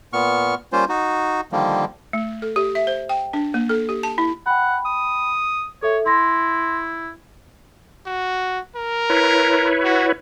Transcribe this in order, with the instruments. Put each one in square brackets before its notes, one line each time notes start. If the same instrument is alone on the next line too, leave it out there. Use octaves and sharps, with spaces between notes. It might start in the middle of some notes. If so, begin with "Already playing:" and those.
[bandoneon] A#2 B3 C#6 F6
G3 A#3 C#4 F4 C5
D#4 F#4
D3 D#3 F3 G3 A#3
[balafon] A3
A4
G4
E5
C5
G5
D4
A#3
A4
G4
A5
E4
[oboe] F#5 [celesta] G5 B5
[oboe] D#6
[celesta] A4 E5 [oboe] C#5
[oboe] E4 [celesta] C6 A#6
[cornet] F#4
A#4
[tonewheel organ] E4 B4 C#5
[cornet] F#4